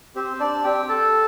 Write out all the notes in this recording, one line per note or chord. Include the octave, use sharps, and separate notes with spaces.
C4 G4 C5
D4 D5
C4 G4 G5
A4 A5